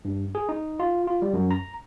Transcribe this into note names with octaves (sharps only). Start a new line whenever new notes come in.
G2
G#4
D#4
F4
F4
G3
F#2
A#5